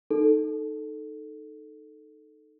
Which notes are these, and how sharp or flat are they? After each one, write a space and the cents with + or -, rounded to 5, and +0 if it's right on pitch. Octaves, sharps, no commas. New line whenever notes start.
D#4 -10 A4 +0